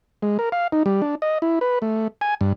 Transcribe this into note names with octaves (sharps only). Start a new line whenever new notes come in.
G#3
A#4
F5
D#4
G3
D4
D#5
E4
B4
A3
G#5
G2